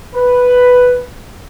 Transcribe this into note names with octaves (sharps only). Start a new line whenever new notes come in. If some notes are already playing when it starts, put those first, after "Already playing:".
B4